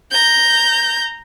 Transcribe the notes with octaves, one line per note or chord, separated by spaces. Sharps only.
A#5 G6